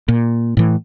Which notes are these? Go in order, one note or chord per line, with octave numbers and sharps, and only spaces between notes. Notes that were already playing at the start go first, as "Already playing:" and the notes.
A#2
A2 E3